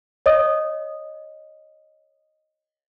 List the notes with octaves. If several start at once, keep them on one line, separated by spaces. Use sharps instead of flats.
C#5 D#5 D#6